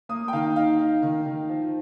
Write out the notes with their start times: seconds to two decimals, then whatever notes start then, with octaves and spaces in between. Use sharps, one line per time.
0.09 A#3 D#6
0.28 G5
0.33 D#3 F5
0.56 D#4 F5
0.79 D#4
1.02 D#3
1.26 D#3
1.49 F3